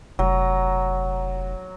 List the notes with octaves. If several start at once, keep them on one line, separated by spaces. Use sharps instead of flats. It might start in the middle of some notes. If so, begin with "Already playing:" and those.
F1 F#3